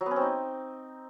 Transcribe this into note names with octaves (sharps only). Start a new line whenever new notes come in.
F#3
B3
C#4
C4
D#4